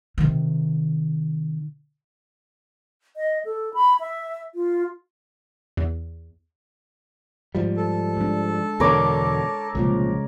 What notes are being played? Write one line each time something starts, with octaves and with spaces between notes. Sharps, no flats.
C3 D#3
D#5
A4
B5
E5
F4
E2
G#2 F3 G3
A4
G#3 D4
E2 B2 D3 A#4 C#5 D6
C2 A#2 C#3 F3 G#3